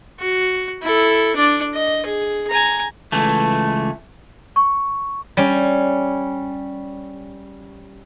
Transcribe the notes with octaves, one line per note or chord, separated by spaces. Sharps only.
F#4
E4 A4
D4 D5
D#5
G#4
G#5 A#5
C#2 E3 A3
C#6
G3 C#4